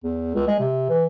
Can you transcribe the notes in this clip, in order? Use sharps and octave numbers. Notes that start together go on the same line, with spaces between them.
E2
C#2
G#3
C3
E3